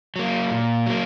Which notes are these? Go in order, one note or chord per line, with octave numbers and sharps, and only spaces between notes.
F#3 A#3
A#2
F#3 A#3